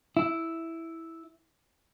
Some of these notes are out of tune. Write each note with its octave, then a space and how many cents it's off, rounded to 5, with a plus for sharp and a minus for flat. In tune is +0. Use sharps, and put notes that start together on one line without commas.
E4 -5